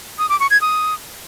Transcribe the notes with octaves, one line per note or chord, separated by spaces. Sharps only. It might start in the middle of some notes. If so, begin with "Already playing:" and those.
D#6
D6
C#6
G#6
D#6